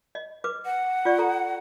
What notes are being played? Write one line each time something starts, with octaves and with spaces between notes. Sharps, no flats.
D#5
B4 D6
F#5
F4 D5 C#6
A4 A#5